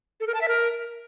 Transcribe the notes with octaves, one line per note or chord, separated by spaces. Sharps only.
A4
A#4
A5
E5
A#4